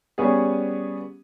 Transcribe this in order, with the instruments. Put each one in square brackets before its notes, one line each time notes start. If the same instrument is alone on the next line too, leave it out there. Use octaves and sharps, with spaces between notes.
[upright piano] G3 B3 C#4 G#4